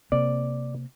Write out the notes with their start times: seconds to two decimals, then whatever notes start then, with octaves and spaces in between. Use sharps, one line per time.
0.12 C3 A#3 C4 D5